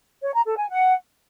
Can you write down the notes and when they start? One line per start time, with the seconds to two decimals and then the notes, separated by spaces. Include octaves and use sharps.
0.23 C#5
0.34 A#5
0.46 A4
0.57 G#5
0.68 F#5